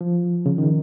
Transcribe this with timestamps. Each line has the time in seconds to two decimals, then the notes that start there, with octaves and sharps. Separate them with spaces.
0.01 F3
0.46 C#3
0.58 D#3